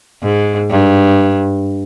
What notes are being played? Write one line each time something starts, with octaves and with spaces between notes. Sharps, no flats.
G#2
G2